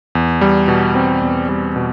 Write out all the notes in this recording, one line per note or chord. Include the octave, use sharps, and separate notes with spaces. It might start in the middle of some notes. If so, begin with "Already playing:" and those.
E2
G3
B2
C4
E2
G3
B2